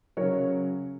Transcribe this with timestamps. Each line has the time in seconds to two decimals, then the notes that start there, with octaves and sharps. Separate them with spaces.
0.17 C#3 F#3 A#4 C#5